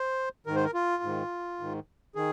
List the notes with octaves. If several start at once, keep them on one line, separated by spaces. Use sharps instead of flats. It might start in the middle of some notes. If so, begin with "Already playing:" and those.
Already playing: C5
G#2 D#3 A#4
C5
A#4
F4
G#2 D#3
G#2 D#3
D#3 G#4